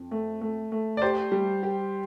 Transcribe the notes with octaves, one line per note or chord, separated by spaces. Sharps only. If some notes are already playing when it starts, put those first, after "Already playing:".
Already playing: F2
A3
A3
A3
D5
G4 C5
G3
G4